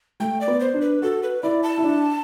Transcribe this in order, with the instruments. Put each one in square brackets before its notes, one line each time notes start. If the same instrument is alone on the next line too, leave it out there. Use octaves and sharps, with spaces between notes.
[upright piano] A3 [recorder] G5
[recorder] D5
[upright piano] B3
[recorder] C5
[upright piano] D4
[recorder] B4
[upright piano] F#4 [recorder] A4
[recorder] B4
[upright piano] E4 [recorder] D5
[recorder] A5
[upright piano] E4
D4